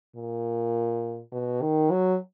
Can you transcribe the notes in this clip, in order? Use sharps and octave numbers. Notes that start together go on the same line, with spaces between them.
A#2
B2
D#3
F#3